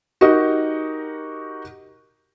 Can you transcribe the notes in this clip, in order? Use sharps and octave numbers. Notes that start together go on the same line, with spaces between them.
D#4 F#4 G4 A#4 D#5